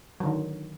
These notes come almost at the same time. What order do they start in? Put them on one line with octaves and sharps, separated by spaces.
F#3 D3 D#3